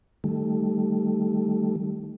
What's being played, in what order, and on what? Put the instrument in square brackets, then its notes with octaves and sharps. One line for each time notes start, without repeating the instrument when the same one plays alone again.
[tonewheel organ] D#3 G3 A3